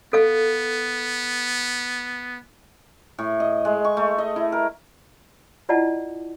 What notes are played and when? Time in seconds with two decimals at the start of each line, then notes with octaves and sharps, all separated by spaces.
0.13 B3 A4 F5
3.18 A2
3.40 D#5
3.65 G#3
3.85 C#6
3.97 A3
4.18 D#5
4.36 E4
4.52 A#4
5.69 E4 F4 D5 D#5 F#5 A5